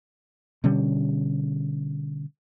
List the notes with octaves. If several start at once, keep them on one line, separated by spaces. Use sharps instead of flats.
B2 D3 G3 C#4